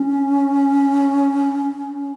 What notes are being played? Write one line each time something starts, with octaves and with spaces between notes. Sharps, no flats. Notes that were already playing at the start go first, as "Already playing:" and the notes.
Already playing: C#4